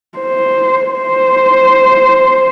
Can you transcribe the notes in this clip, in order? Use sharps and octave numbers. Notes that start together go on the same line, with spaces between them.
C5
C5